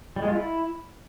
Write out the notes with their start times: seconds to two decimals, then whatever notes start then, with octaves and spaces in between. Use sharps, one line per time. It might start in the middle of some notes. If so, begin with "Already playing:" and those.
0.16 G3
0.22 G#3
0.28 F4
0.33 E4